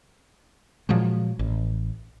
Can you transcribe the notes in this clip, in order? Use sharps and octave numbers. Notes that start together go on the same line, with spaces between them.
A#2 F3 F#3 G#3
A1